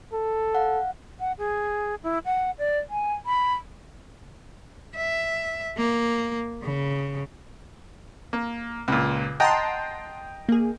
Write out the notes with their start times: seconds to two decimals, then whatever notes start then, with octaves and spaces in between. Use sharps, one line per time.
0.13 A4
0.55 F5 F#5
1.20 F#5
1.38 G#4
2.03 E4
2.25 F#5
2.59 D5
2.90 G#5
3.26 B5
4.96 E5
5.77 A#3
6.63 C#3
8.33 A#3
8.88 C#2 A#2
9.40 D#5 F#5 G5 A5 A#5 C6
10.49 A#3 G#4